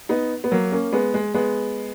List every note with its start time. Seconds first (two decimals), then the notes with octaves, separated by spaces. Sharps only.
0.09 B3 D#4
0.44 B3
0.51 F#3 A#3
0.72 A#3 C#4
0.93 G#3 B3
1.14 G#3
1.34 G#3 B3